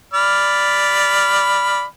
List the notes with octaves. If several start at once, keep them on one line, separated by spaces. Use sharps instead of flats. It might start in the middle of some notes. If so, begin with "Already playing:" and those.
D5 B5 F6